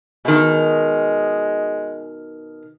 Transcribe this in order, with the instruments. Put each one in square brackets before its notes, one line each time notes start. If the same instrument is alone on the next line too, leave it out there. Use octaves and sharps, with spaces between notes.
[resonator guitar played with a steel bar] B2 D#3 [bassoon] G#3